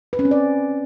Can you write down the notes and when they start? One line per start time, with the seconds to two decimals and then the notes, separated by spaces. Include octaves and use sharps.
0.13 B4
0.19 C#4
0.25 C4
0.31 D5